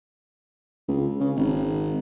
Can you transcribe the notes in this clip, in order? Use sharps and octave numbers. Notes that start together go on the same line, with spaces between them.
C#2
C#3
G#1